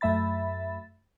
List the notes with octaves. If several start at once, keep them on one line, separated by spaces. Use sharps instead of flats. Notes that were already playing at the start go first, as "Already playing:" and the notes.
F#2 A3 E5 B5 A6